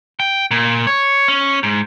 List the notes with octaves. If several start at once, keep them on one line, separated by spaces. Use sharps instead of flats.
G5
A#2
C#5
C#4
G#2